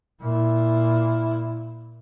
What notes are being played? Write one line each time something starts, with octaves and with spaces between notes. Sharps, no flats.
A#2 E4